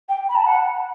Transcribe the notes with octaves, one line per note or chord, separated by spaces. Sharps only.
G5
B5
A5
F#5